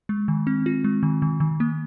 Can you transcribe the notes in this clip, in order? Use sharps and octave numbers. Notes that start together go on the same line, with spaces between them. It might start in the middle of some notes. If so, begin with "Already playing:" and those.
G#3
D#3
C4
F4
G#3
D#3
D#3
D#3
A#3